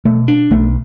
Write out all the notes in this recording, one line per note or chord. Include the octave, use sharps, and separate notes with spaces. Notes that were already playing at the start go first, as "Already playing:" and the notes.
B2 A3
D4
B1 A3